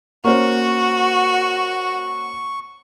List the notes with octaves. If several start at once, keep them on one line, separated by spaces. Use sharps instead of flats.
A#3 C#4 F#4 C5 C#6